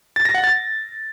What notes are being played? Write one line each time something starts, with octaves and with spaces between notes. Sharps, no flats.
A6
A#6
F#5
A6